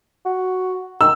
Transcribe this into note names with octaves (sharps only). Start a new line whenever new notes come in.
F#4
D#3 E6